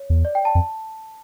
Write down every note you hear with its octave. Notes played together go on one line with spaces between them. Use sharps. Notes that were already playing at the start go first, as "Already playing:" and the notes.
Already playing: C#5
E2
D5
G5
A5
F2